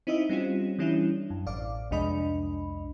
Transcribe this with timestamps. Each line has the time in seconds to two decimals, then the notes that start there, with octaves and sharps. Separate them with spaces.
0.07 C4 D#4 E4 D#5 E5
0.29 G3 C4 C#4 F4
0.79 E3 G3 C#4 D4 E4
1.30 F#2
1.46 A1 D5 F5 D6
1.91 C2 F2 G#3 D4 D#5 B5